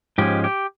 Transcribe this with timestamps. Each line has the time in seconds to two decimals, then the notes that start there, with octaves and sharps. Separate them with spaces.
0.18 G#2 F3 G#3 C#4 G4
0.44 G4